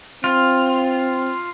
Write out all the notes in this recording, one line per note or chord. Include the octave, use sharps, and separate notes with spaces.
C4 F4